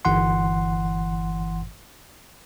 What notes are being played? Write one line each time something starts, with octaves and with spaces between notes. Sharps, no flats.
G1 E3 F#5 C6